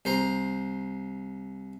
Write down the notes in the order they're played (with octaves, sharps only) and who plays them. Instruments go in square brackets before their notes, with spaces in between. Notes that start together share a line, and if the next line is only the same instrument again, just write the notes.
[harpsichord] C2 C5 A#5 C6